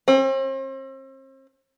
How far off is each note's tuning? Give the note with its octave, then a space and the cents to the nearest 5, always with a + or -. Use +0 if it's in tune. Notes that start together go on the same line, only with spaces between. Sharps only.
C4 +40